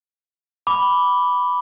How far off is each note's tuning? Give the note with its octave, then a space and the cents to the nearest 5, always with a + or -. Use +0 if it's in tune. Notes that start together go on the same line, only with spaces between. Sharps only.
B5 +0 D6 -10